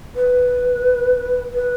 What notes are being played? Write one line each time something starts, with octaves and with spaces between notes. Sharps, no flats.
B4
B4